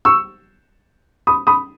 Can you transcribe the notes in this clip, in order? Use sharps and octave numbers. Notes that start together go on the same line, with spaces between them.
C#6 E6
B5 D#6
B5 D#6